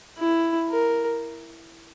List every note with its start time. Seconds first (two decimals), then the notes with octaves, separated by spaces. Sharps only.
0.19 E4
0.70 A#4